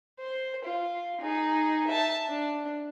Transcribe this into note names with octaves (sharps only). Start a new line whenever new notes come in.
C5
F4
D#4 G#4
E5 A5
D4